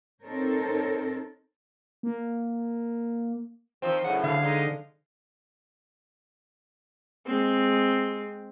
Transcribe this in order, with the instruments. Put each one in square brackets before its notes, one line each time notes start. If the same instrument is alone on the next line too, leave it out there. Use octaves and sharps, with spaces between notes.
[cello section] C4 D#4 A4 A#4 C5 C#5
[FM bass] A#3
[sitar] D#3 F3 C4
[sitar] F#2 A2 C#3 [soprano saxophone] F#5
[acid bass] D3 [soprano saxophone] F5
[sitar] G#3 D#4
[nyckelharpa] G#3 C4